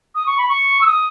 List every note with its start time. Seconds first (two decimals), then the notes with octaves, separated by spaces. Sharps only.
0.15 D#6
0.26 C#6
0.38 B5
0.49 C#6
0.81 E6
0.86 D#6